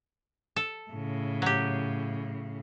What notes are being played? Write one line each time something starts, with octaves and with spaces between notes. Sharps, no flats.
A4
A2 C#3
F#3 G4